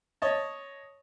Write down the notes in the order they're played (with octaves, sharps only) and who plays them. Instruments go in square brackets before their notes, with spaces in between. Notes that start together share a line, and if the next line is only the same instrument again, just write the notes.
[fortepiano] C#5 D#5 A5